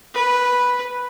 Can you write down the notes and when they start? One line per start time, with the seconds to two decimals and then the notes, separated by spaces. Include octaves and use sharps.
0.14 B4